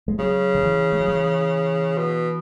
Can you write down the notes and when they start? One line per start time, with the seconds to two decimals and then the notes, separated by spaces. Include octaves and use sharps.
0.08 G#3
0.19 C#3 F#3
0.55 D3
0.63 E3
0.93 G#3
1.01 F#3
1.08 E3
1.97 B2